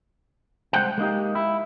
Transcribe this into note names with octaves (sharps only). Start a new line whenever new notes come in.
C2 G#3 C5 F#5 G5
G#3 A#3 D#4 G4
E4